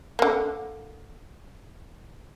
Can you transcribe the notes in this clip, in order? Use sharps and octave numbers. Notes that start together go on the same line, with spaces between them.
D3 A#3